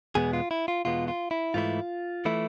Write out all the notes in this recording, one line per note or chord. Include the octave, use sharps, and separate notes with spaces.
E2 B2 G#3 B3 G#4
F4
E4
F4
E2 B2 G#3 B3 F4
F4
E4
G#2 E3 A3 E4 F4
E3 A3 E4